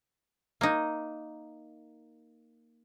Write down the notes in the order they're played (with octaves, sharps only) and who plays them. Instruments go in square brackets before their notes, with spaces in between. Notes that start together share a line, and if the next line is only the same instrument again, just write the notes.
[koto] A#3 D#4